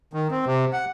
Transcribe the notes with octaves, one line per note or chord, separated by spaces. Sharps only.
D#3
C4
C3
F#5